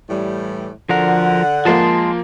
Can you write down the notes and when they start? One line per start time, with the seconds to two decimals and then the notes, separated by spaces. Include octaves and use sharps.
0.09 A2 E3 G3
0.89 D3 F3 F#4 A#4 F#5
1.65 F3 G#3 A#3 A5 C6